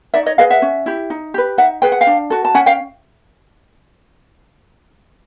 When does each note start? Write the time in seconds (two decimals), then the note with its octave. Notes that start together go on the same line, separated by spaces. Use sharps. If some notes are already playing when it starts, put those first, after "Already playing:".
0.14 D#4 D5 E5
0.26 C#5 D#5
0.38 G#4 B4 D#5 F5
0.50 E5 F#5
0.62 C#4
0.86 E4 G4
1.10 D#4
1.34 G4 B4
1.58 D#4 E5 F#5
1.82 G#4 B4 G5
1.92 F#5
2.01 F5 G5
2.07 D4
2.30 F#4 A4
2.45 A5
2.54 C#4 F#5 G#5
2.66 F5 G5